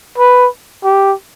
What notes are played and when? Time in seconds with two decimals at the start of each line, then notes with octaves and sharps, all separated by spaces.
0.18 B4
0.84 G4